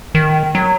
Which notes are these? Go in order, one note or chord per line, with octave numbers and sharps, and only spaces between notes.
D#3
F#3